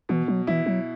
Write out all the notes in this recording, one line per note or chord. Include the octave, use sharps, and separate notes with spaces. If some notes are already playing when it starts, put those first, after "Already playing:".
B2 E3
F#3
E3 E4
F#3